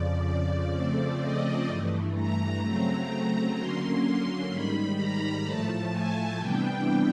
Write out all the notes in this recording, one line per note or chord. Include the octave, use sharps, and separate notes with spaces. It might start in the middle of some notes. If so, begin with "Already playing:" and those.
Already playing: F2 C#3 F3 D5
D5
C#3 F3 A3 C4
D#5
G2 E3 A3
A#5
C#3 F#3 A3 C4
D3 F#3 A#3 C#4 C6
C6
G#2 D#3 G3 B5
A#5
A2 F3 A3 A5
G#5
C3 E3 G3 B3 D4 G5